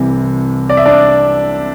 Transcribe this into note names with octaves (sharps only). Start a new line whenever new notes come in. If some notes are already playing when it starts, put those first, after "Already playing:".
Already playing: C2 C3 E3
D5
E5
D4 D5